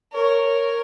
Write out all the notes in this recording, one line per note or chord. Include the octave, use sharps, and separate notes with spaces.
A#4 C#5
A#4